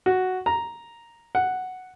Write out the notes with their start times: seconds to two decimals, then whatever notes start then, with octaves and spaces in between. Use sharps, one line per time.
0.06 F#4
0.46 A#5
1.35 F#5